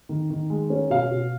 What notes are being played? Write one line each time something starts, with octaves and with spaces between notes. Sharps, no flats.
D#3
D#3
G#3
C#4
B2 F5
B2